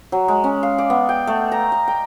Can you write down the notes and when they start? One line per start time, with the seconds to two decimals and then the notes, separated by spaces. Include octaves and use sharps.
0.12 F#3
0.28 G#3
0.44 C#4
0.63 F5
0.78 D5
0.90 B3
1.09 G5
1.27 A3
1.52 A#5
1.72 D#5
1.88 G5